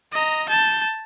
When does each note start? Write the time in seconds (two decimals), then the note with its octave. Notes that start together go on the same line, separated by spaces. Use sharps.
0.12 D#5 A#5
0.48 A5 G6